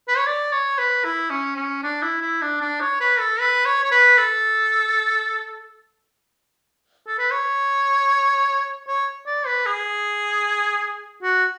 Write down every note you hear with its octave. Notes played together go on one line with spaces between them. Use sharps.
B4
C#5
D5
C#5
B4
E4
C#4
C#4
D4
E4
E4
D4
D4
C#5
B4
A4
B4
C#5
C#5
B4
A4
A4
B4
C#5
C#5
D5
B4
G#4
F#4